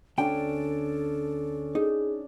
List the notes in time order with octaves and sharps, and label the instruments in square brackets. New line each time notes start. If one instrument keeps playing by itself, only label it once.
[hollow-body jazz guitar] D2 G5 [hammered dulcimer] C#4 D4 [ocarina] A4 [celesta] D7
[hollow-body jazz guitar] D#4 [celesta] G#4